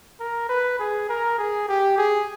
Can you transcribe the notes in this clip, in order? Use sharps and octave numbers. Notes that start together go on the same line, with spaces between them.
A#4
B4
G#4
A#4
G#4
G4
G#4